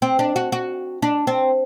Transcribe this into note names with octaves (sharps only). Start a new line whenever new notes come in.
C4
D4
F#4
F#4
D4
C4